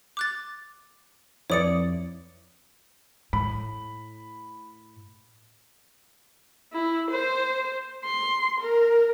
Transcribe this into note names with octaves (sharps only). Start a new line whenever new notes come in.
D6 F#6 A6
F2 E4 B4 C#5 D5 D#6 C#7
A2 B5
E4
C5
C6
A#4